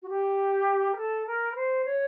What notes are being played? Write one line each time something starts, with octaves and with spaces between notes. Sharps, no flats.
F#4
G4
A#4
A4
A#4
B4
C5
C#5